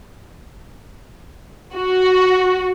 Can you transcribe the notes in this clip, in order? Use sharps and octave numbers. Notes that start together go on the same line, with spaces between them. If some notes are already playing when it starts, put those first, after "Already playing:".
F#4